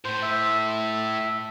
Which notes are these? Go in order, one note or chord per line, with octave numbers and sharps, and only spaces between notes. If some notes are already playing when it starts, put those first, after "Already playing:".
A2 C5
E5